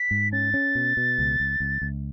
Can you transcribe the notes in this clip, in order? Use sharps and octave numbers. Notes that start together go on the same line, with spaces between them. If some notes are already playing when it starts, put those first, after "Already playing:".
Already playing: B6
G#2
C#4 A6
C#4
B2
B2
C#2
C#2
C#2
C#2